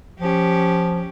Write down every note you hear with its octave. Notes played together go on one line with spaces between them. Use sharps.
F3 C#4 G4